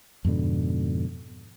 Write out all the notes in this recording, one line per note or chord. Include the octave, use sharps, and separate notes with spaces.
F2 G#2 B2 D3